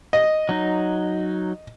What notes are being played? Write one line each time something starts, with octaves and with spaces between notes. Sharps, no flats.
D#5
F#3 D#4